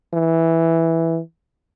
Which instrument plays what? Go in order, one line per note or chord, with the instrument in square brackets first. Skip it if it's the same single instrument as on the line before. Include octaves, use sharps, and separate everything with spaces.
[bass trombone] E3